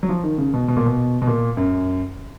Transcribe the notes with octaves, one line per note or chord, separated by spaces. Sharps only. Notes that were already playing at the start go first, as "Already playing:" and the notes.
F#3
F3
D#3
C#3
B2
B2
A#2
B2
B2
A#2
F#2